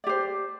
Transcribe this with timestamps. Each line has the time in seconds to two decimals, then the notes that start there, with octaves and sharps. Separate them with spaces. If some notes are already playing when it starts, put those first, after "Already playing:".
0.04 D5
0.07 G4
0.09 C5